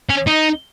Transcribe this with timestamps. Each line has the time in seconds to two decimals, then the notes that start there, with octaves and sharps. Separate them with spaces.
0.09 C#4
0.27 D#4